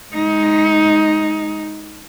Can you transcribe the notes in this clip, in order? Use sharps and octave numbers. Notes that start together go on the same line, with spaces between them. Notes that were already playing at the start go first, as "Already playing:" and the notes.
G#3 D#4